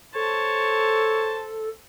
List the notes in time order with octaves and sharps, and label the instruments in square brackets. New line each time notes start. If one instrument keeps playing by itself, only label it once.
[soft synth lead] A4 [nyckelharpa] C5 A5 [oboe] C#5